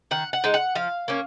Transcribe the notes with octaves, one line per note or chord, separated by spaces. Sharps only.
D#3 F#5
F#5
G#3 D#4
F#5
F3 F5
A#3 C#4